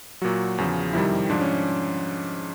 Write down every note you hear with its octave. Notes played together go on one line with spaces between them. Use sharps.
A#2 F#3 F#4
E2 C#3 F3
F2 C3 D#3 G3 E4
G#2 F3 D4
C#4